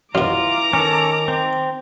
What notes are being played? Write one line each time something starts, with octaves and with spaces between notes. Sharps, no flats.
F#2 B2 E3 F4 A#5 D6
D#3 C#4 A4
C4